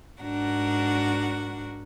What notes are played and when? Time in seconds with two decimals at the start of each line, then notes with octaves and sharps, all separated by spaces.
0.22 G#2 D4 F#4 A#4 F#5